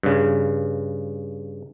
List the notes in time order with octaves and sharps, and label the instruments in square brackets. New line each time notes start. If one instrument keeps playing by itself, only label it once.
[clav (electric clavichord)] G2 C#3